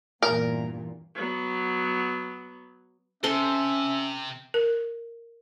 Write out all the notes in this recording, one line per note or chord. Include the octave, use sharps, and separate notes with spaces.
E2 G2 A#2 A#4
F#3 B3
C3 C#4 A4 C5 E5 C6
A#4